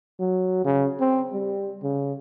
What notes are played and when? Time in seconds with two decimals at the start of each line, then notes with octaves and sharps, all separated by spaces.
0.20 F#3
0.65 C#3
1.01 C4
1.33 G3
1.83 C#3